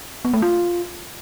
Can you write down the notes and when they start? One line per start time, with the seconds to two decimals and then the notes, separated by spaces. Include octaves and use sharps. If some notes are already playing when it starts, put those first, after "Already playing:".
0.25 B3
0.33 A3
0.42 F4